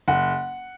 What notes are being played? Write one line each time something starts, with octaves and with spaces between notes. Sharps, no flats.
F#1 F#5